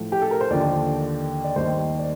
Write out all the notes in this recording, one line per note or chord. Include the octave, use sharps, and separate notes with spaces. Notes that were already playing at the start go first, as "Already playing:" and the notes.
Already playing: A2 F3 A3
G4
A4
A#4
C5
D#2 D3 F3 D5
D5
D#2 D#3 G3 C5
D5